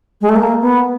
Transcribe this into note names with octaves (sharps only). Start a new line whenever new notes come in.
G#3
A3
A#3
B3